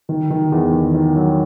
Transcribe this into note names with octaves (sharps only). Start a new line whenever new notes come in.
D#3
D#3
E2
D#3
D#3
F#3